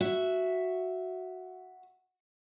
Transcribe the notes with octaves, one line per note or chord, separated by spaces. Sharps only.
F#4 E5